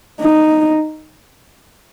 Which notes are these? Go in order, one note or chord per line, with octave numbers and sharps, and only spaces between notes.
D#4